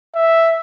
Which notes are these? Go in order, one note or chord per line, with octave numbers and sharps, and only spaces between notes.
E5